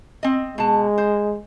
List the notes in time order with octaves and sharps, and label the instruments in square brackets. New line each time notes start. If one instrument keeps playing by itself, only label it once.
[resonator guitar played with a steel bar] C4 D#5
[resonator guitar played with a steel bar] B2 A5 [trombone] G#3
[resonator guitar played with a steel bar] C5